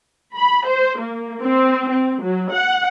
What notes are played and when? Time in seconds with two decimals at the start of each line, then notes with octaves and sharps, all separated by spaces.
0.33 B5
0.66 C5
0.99 A#3
1.42 C4
1.89 C4
2.23 F#3
2.53 F#5